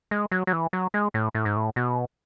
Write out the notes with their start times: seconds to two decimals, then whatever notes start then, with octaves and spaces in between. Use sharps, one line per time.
0.11 G#3
0.32 F#3
0.47 F#3
0.53 E3
0.73 F#3
0.94 G#3
1.14 A2
1.35 A2
1.45 G#2
1.56 A2
1.76 B2